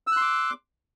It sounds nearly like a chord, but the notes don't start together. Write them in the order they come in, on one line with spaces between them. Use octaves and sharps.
E6 F#6 C6 D6